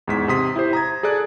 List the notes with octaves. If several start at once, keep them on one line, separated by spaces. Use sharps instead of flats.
E2 G#2 B6
C3 C6 D#6 B6
E4 G4 C5
A#5 D#6 G#6
G#4 A4 D5 F#6